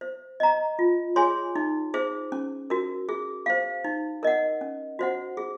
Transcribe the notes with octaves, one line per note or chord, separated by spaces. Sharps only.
C5
D#5 A#5
F4
G#4 C#5 G#5 C6
D#4
G#4 C5
C#4
F#4 A#4
G#4
C5 F5
D#4
A#4 D#5 F#5
C#4
F#4 C5 F#5
G#4